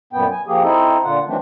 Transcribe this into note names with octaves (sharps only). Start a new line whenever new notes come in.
F#2 A#2 B3 G5
G#5
F3 A#3 G4 G#4
C4 D#4 E4 A4 D#5
A#2 D3 F4 F#5
D#3 E3 F#3 A3 C4 D4